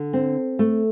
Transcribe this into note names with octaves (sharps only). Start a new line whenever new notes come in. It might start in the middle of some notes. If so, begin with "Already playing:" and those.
Already playing: D3
C4
A3